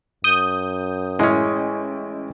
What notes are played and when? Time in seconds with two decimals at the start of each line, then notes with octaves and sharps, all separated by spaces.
0.24 F#2 D#6 G6
1.19 A1 G#3 C#4 E4 G#5